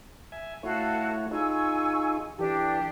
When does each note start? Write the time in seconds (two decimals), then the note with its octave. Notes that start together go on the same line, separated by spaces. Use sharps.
0.32 E5 G#5
0.63 A3 E4 F#4 A4 C#5 F5
1.31 D#4 F4 G#4 G#5 C#6 E6
2.39 E3 D4 G4 A4